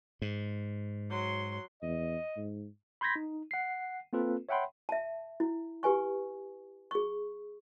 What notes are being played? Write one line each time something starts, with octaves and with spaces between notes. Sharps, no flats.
G#2
F#3 C6
E2 D#5
G#2
B5 C6 G6 G#6 A#6 B6
D#4
F#5 C7
A#3 C4 F4 A4 B4
C#5 E5 F#5 G5 B5 C6
E5 A5
E4
G4 B4 G#5 C#6
G#4 C#6